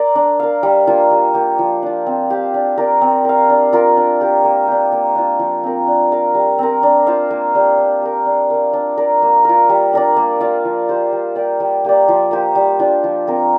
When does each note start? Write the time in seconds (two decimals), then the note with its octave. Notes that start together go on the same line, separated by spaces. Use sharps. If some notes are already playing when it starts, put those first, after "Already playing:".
Already playing: A#4 D5
0.15 D4
0.40 A#4 F5
0.63 G3
0.87 A#3 D4 F4
1.11 G3
1.34 A#3 G4
1.59 F3
1.83 D4 F4
2.06 C4
2.30 G4 C5 F5
2.54 D4
2.78 G4 A#4 D5
3.01 C4
3.25 A#4 F5
3.50 D4
3.73 F4 A#4
3.97 D4
4.21 G4 A#4
4.44 A#3
4.68 D4 G4
4.92 A#3
5.15 D4 F4
5.39 F3
5.64 C4 A#4
5.87 D4
6.12 A#4 F5
6.35 G3
6.59 C4 A#4
6.83 D4
7.07 F4 C5 F5
7.31 A#3
7.55 D4 G4
7.78 D4
8.02 G4 A#4
8.26 D4
8.50 A#4 F5
8.73 D4
8.98 A#4 D5
9.22 A#3
9.45 F4 A#4
9.69 G3
9.93 D4 A#4 D5
10.16 A#3
10.41 F4 D5 F5
10.65 F3
10.89 A#3 G4 C5
11.12 G3
11.36 A#3 G4 D5
11.60 G3
11.85 A#3 G4 D5
12.08 F3
12.31 A#3 G4 C5
12.55 G3
12.79 D4 F4
13.04 F3
13.27 C4 A#4